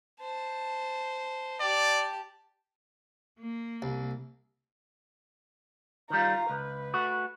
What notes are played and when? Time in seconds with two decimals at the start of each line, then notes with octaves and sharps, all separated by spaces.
0.20 C5 A5
1.61 G4 D5 A5
3.39 A#3
3.82 C2
6.10 D#3 G3 F4 A#5
6.50 C#2 B4
6.94 A3 F#4